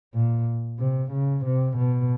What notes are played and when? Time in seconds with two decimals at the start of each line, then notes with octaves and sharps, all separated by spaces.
0.14 A#2
0.79 C3
1.12 C#3
1.45 C3
1.77 B2